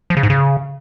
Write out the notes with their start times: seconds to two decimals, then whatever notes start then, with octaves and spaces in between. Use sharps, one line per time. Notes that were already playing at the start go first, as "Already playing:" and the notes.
0.10 F3
0.17 C#3
0.23 G#2
0.30 C#3